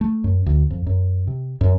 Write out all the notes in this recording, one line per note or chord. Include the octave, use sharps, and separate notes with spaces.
A3
F#2
D2
F2
F#2
C3
F#2